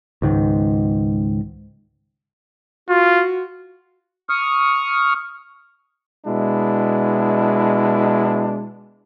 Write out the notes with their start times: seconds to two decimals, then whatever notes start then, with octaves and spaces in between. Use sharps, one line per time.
0.22 C#2 G#2 D#3
2.89 F4 F#4
4.29 C#6 D#6 F6
6.26 B2 G#3 D4 E4